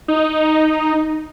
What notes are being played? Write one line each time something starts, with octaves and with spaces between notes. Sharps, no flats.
D#4